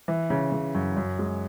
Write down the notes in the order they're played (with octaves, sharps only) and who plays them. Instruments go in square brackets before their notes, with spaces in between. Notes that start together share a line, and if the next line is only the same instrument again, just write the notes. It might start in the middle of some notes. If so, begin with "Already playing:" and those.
[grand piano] E3
C#3
C#3
F#2
F#2
G#3